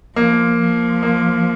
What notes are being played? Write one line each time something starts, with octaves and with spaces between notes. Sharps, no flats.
F3 A#3
F3
A#3